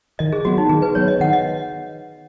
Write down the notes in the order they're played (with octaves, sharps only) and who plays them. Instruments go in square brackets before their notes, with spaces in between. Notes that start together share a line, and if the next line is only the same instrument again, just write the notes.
[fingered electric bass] D#3 [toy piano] D#5
[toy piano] G#4
[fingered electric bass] F#3 B3 [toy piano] F#4
[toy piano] D#4
[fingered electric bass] D#3 [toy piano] G#4
[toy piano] B4
[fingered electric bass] F#3 B3 [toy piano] C#5
[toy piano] D#5
[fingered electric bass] D#3 [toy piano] F#5
[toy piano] D#5